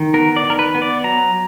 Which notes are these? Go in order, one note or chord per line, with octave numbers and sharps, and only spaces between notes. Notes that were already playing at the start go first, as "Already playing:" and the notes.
Already playing: D#3
B3 A#4
D5
D#3
A#4
B4
B3
D5
F#3 A#5